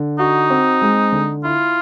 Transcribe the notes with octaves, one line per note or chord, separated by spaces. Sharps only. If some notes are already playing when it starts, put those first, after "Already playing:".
Already playing: D3
D#4 F#4
C4
G#3
D3
E4 F4